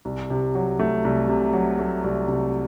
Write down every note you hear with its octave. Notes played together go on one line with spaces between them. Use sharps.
C2
C3
F#3
A3
C2
C3
F#3
A3
C2
C3